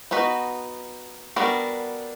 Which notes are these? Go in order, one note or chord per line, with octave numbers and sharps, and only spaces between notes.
B3 D#4 F#4 B4
G3 B3 D4 F#4 A#4